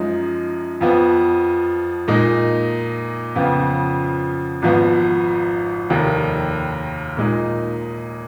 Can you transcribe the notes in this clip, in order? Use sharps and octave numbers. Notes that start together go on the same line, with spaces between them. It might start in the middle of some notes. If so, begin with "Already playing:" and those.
Already playing: F#2 F3 G#3 D#4
F2 F3 B3
A#2 G#3 D#4
F2 C#3 F3 B3 F4
G#1 G#2 F3 B3
F1 D#2 D#3
A#2 G#3 D#4